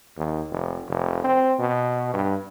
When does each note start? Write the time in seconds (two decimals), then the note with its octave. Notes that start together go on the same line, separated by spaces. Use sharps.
0.17 D#2
0.51 F1
0.89 F1
1.24 C4
1.59 B2
2.14 G2